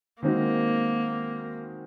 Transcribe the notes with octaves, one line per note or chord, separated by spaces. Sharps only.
D#3 G#3 A#3 C4 D#4 F#4